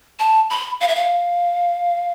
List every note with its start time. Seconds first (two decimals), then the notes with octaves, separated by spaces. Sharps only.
0.19 A5
0.50 B5
0.81 F5
0.88 E5
0.95 F5